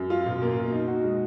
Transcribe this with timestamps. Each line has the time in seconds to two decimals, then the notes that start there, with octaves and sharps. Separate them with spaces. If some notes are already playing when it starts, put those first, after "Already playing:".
Already playing: F#2
0.10 F4
0.26 B2
0.42 A#3
0.56 B2
0.72 D#4
0.88 F#4
1.03 G#3